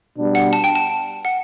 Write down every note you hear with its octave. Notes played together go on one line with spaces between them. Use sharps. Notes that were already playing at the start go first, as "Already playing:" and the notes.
B2 G3 B3 D4
F#5
A5
G5
A5
F#5